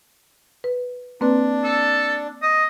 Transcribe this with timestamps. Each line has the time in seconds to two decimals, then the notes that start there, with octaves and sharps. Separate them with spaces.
0.64 B4
1.21 A#3 C4 D4 B4
1.64 A4
2.42 D#5